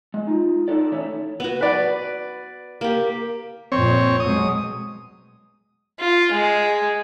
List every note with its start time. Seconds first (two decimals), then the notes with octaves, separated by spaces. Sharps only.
0.14 G#3
0.27 D#4 F4
0.68 D4 D#4 A4 D5
0.92 E3 A3 C#4 E4 C#5
1.40 B3 F#4
1.61 B4 D5
2.81 A#3 G4
3.72 F2 A#2 C4 C#5
4.20 B2 F#3 G#3 D#6
6.00 F4
6.32 G#3